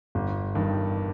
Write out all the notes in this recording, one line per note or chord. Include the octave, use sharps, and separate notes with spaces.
G1
G2 D#3